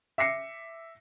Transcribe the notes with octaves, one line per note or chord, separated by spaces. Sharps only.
E5 D6 A#6 C7 C#7